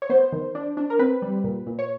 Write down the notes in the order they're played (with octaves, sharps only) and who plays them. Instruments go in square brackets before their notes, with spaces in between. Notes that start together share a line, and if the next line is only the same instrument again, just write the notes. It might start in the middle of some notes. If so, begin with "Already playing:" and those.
[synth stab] C#5
B3 C5
D#3
D4
D4
A#4
C4 B4
G3
A#2
A#2
C#5